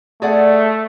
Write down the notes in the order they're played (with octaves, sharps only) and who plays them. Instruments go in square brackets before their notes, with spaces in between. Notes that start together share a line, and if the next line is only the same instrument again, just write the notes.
[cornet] A3 [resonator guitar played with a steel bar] G#4 D5 F#5